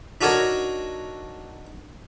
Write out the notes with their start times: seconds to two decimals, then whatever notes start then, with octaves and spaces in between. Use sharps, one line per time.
0.21 D4 D#4 F#4 A4 A#4 C#5